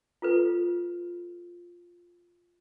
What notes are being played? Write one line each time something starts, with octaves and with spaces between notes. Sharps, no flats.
F4 A4 B4